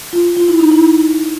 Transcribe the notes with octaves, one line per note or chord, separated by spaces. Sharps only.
F4
F4
E4
D#4
E4